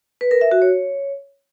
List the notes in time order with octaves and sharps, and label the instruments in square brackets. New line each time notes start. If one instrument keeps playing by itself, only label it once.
[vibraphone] B4
A#4
E5
F#4
C#5